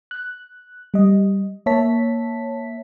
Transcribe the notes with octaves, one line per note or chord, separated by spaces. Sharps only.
F#6
G3 D#5
A#3 C#5 E5 A5 B6